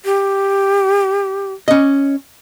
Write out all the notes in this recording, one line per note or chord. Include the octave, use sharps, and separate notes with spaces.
G4
C#4 D#5